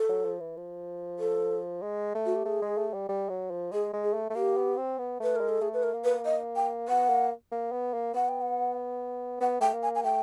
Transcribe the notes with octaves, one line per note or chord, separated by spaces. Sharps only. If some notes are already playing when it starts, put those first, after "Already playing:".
Already playing: A4
F#3
F3
E3
F3
A4
G#3
A3
F#4
G4
A3 G#4
G#3
A3
G3
G3
F#3
F3
G#3 G#4
G#3
G#4
A3
A3
A#3 G4
B3
C4
B3
A3 B4
G#3 A#4
A4
A3 G#4
B4
A#4
A#3
B4
D#5
G5
B3 F#5
A#3
A#3
B3
A#3
B3 F#5
G5
F#5
B3 F#5
A3 G5
A#3
G#5
G#5
A3 G5